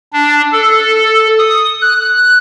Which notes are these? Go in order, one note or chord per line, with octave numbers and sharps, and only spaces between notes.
D4
A4
D#6
F#6